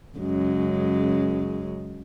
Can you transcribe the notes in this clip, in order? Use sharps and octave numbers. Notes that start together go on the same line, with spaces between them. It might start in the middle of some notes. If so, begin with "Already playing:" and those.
F#2 C#3 G#3